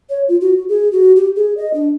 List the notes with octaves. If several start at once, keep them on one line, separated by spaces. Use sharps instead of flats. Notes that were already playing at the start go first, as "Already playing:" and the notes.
C#5
F4
F#4
G#4
F#4
G4
G#4
D#5
D4